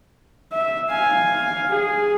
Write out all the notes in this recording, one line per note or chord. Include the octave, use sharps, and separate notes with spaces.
E5
F5 G#5
G#4